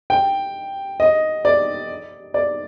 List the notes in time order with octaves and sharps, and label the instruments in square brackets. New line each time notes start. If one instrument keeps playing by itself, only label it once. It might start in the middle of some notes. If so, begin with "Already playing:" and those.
[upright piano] G5
D#5
D5
D5